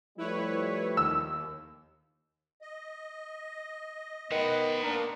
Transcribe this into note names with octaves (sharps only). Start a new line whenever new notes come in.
F3 G3 A3 E4 B4 C#5
D#2 E6
D#5
D#3 B3 C5 F#5
A#3 B3 D4 A#4